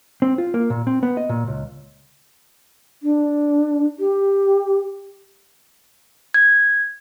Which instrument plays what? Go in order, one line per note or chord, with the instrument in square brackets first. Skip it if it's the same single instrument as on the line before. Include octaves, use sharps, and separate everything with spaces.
[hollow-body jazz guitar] C4
F4
A#3
A#2
C4
B3
D#5
A#2
C#2
[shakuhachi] D4
G4
[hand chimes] G#6